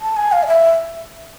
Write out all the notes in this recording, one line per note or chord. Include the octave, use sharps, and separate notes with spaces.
A5
G#5
F5
D5
E5